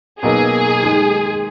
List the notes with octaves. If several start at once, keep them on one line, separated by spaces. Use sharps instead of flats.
B2 F#3 A#3 D#4 G#4 A#4
D#3 G#3 D#4